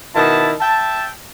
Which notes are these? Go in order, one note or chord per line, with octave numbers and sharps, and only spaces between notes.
B2 D#3 E4 A5
E5 G5 A5